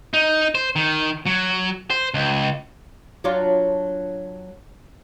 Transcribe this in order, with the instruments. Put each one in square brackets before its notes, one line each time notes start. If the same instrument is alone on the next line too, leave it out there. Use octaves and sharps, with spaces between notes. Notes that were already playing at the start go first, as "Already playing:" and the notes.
[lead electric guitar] D#4
C5
D#3
F#3
C5
C#2
[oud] F#3 D4 F4